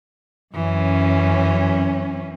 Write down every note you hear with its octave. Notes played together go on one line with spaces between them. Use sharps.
F#2 E3 C#4